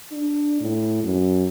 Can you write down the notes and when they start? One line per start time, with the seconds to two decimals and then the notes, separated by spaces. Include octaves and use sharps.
0.12 D4
0.61 A2
1.04 F#2